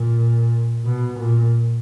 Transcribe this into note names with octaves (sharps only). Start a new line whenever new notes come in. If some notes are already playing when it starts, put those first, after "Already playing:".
Already playing: A#2
B2
A#2